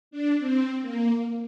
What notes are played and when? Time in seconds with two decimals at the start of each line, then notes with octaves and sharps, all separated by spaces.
0.11 D4
0.39 C4
0.82 A#3